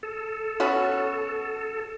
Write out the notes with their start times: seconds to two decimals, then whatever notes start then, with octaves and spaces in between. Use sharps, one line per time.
0.03 A4
0.60 B3 C#4 F#4